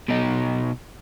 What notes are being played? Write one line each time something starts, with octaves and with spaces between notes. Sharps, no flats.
B2 D#4